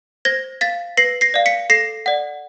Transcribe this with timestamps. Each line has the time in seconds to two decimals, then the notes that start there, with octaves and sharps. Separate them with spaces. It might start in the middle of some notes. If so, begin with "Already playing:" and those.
0.25 C5 G#6 A#6
0.61 F5 A6 B6
0.97 B4 A#6 C7
1.21 A#6 C7
1.34 D5 F5
1.46 B6 C#7
1.70 A4 A#6 C7
2.06 D5 F#5